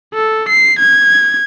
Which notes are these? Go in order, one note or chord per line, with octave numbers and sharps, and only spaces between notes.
A4
C7
G#6